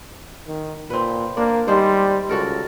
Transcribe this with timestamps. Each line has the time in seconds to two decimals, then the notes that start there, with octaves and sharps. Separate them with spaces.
0.48 D#3
0.90 A#2 C4 B4
1.37 A#3 D4
1.68 D#3 G3 G#3 C5
2.29 C#2 F#4 A4 A#4